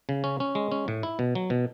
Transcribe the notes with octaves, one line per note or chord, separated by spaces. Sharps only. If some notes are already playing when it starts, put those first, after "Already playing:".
C#3
C#4
C#4
G#3
C#4
A2
E4
B2
F#3
B2